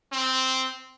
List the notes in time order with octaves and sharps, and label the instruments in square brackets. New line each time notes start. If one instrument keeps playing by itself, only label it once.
[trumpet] C4